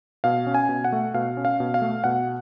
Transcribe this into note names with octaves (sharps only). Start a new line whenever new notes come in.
B2 F5
C#4
G#5
B2
F#5
A3
B2 F5
C#4
F5
B2
F5
A3
B2 F#5